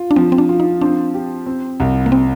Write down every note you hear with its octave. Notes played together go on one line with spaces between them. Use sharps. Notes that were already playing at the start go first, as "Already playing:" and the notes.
Already playing: F4
D4
F3 C4
C4
D4
F4
D#4
C4 D4
G4
C4
C2
A#3
C4